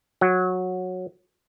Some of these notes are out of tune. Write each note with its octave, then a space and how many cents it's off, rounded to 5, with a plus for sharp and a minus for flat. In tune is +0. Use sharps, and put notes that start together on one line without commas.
F#3 -15